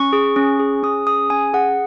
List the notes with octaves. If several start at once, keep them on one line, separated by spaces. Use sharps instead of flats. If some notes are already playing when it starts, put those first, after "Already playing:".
Already playing: C#4 C#6
G#4
C#4
G#4
C#4 D#6
G#4 D#6
C#4 G#5
G#4 F#5